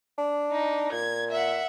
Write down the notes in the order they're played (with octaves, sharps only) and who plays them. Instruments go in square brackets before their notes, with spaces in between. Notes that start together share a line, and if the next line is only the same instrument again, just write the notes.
[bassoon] D4
[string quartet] D#4
[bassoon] A#2 [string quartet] G#6
[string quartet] E5 F#5